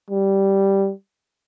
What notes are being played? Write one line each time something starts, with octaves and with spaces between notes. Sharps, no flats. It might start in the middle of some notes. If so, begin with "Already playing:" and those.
G3